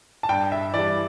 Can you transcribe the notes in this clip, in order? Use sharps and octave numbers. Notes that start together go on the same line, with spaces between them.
A5
G2 G5
E5
E3 G3 D5